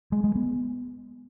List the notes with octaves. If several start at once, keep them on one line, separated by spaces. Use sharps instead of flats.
G#3
G#3
B3